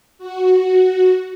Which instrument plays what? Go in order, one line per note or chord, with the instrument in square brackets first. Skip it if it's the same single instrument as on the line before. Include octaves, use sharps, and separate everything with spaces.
[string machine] F#4